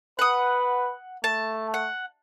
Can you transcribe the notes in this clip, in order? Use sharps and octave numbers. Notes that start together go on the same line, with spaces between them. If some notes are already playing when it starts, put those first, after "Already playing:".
B4 F#5 D#6
A3 A5
F#5